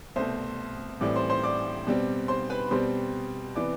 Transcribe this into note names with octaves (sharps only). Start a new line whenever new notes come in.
C2 B2 A3 C4 C5 C6
A2 E3 G3 C4 D5 D6
C5 C6
C5 C6
D5 D6
B2 G3 C4
C5 C6
B4 B5
B2 G3 C4 C5 C6
C3 E3 B3 D5 D6